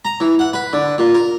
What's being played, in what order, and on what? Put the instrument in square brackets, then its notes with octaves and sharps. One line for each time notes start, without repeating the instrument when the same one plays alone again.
[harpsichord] A#5
E3
F#5
B4
D3
A#2
A#4